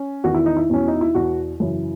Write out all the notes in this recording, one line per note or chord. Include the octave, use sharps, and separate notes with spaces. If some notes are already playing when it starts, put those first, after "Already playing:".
Already playing: C#4
E2 D#3 F#4
E4
D#4
E4
E2 B2 C#4
D#4
E4
E2 B2 F#4
F#2 C#3 E3